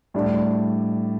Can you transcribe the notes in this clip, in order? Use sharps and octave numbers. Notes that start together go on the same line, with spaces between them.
A2 G3 D4